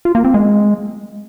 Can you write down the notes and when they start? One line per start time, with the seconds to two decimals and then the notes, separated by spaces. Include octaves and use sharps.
0.05 F4
0.15 A#3
0.24 C4
0.34 G#3